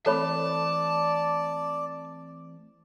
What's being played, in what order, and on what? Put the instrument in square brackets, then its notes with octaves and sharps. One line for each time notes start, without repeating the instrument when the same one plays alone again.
[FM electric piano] E3 A3 C4 [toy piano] A4 C#5 B5 [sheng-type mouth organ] D5 [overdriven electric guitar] A5